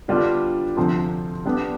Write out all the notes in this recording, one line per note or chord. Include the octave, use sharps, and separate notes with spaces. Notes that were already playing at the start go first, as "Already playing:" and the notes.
D3 G3 B3 D4 F4
D2 C3 F3 C4
G3 B3 D4